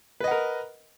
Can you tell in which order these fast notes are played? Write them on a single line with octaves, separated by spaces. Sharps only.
B4 D#5 F#5 A#4